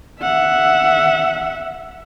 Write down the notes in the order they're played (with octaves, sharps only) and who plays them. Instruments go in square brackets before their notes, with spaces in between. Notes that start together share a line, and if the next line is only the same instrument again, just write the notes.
[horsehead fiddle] E5 F#5